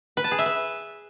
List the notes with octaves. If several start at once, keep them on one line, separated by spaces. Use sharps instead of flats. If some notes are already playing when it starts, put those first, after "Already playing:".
B4
A5
G#4
E5
B4